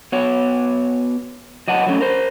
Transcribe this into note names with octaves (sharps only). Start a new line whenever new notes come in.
B3 F#4 C#5
F#3 D#5 F#5 A5
F#3 A3 C#4
A#4 C5